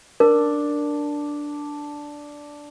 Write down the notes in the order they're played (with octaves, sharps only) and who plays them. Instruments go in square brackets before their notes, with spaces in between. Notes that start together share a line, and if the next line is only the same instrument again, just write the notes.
[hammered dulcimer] D4 [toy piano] A#4